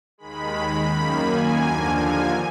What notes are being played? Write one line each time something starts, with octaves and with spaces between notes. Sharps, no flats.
D#2 D#3 G#3 B5
F#2 D#3 A#3
G#5
D#2 D3 F3 A#3
G#5